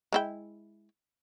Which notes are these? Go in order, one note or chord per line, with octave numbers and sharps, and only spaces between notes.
G#3 E4 G5